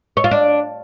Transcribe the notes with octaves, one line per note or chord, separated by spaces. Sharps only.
C#5
F4
D4